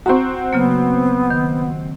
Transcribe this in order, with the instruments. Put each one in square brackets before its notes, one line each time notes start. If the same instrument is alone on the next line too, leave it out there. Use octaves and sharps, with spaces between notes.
[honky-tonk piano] C4 F#4 [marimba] A#5 C6 C#6
[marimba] C#3 F#3 A#3 [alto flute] B3
[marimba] D#3